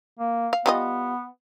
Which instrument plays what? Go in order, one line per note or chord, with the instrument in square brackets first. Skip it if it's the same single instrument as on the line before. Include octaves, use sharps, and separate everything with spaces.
[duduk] A#3
[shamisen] F5
[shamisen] G3 F4 D#5 [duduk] B3